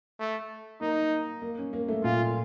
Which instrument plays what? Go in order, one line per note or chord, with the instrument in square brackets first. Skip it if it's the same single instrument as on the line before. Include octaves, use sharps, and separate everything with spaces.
[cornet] A3
[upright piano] A#3 [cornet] D#4
[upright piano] A#3
C#4
A#3
A3
[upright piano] A#2 [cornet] F4